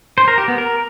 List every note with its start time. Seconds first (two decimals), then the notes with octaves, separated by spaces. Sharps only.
0.18 C5
0.28 A#4
0.38 G4
0.48 B3
0.58 A#4